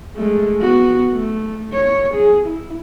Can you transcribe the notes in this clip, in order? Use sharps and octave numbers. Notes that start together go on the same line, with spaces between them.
G#3 A3
B3 F#4
A3
C#5
G#4
E4